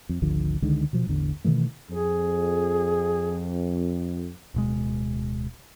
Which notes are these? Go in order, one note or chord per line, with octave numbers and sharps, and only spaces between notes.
F2
G#1 D2 D3 F3
C#2 D3 D#3 G#3
B2 F3
A1 E2 D3
B2 D#3 E3 A3
F2 G#4
D1 B2 G#3